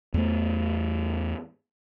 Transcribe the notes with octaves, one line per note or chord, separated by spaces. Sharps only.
E2 A3